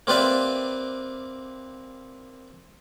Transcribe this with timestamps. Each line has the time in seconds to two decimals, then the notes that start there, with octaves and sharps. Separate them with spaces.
0.07 A#3 C4 G4 B4 D5 E5